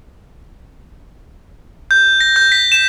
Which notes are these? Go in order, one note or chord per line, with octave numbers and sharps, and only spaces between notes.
G6
A#6
G6
B6
E7